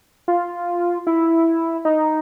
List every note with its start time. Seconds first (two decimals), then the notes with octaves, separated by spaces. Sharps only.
0.28 F4
1.07 E4
1.85 D#4